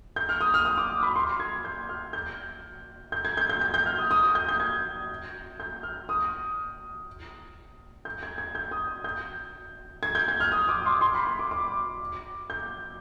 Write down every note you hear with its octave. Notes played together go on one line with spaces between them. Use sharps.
G6
F6
D#6
F6
D#6
D6
B5
C6
G#6
G6
F6
G6
G6
G#6
G6
G6
G6
G6
F6
D#6
D#6
D#6
G6
G6
G#6
G6
F6
D#6
G6
G#6
G#6
G6
D#6
G6
G#6
G6
G#6
F6
D#6
D6
C6
C6
B5
C6
D6
D6
G6